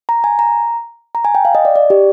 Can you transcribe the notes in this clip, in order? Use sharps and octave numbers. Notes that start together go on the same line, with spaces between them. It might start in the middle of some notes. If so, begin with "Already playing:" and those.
A#5
G#5
A#5
A#5
G#5
G5
F5
D#5
D5
D5
G4